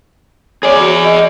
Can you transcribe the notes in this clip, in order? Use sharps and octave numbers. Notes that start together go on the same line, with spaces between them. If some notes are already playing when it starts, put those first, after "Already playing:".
G#4 C#5 D5
F#4
D#5